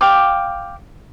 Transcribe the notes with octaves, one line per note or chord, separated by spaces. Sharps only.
F5 G5 D6